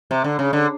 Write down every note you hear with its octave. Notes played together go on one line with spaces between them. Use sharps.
C3
D3
C#3
D3